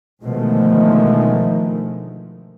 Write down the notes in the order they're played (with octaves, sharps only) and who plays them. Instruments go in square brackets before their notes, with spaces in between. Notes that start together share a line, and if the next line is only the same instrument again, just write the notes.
[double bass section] B2 D3 D#3 F3 G#3 A3